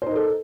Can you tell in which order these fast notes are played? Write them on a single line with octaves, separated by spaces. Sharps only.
C5 D#4 A#4 A4